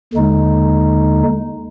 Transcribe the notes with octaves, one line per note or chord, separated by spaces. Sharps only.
D#2 D3 G#3 D#4